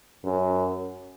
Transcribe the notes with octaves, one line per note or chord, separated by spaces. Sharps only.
F#2